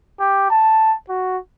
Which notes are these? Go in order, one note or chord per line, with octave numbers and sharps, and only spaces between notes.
G4
A5
F#4